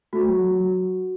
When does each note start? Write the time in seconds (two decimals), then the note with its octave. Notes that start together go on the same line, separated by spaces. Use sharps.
0.13 A3 F#4
0.28 F#3
0.43 F#3
0.58 F#3